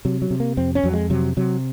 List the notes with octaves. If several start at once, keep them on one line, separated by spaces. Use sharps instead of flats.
C3 F#3
F#3
C3
A#3
F2 C4
C#4
F2 F#3
G#3
C3 F#3
C3 F#3